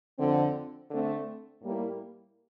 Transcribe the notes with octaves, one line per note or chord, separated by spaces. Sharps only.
F2 D3 F3 C4
D3 A3 C4
A2 G3 A#3 E4